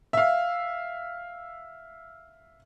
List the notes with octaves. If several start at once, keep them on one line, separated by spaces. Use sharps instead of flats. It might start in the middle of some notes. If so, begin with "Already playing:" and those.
E5 F5